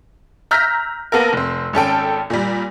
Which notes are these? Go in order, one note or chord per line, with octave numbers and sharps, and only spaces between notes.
A#5 E6 F6 G6 A#6 B6
A#3 B3 A4 A#4
F1 C4
G#1 C#4 A4 G5
A#2 G3